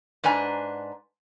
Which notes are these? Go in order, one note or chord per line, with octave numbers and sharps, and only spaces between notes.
G#2 D4 B4 G#5 A#5